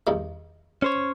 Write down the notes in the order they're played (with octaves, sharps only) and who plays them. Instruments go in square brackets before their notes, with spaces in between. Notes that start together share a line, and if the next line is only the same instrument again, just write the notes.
[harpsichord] E2 G2 D#3
[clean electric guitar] C#4 C5 C#5